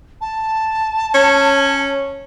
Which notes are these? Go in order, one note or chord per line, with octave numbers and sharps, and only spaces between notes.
A5
C#4